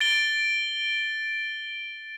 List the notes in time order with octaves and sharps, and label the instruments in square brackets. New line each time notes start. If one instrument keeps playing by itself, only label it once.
[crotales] A6 D7 G7